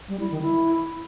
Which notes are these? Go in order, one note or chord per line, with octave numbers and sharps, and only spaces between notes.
G3
E4
D#3
E4